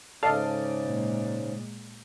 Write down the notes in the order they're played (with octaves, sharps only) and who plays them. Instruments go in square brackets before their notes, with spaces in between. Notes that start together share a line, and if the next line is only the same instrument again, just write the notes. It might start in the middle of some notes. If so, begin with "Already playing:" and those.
[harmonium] G#2 C#3 [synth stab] A4 F5 [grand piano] D5 D#5
[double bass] A#2 G#3